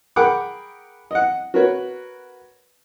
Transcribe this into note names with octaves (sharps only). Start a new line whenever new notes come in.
G#4 A#4 F#5 G5 B5 D6
D#5 F#5
F#4 A#4 B4 C#5